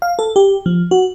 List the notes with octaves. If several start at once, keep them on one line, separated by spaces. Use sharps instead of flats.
F5
A4
G4
F3
F#4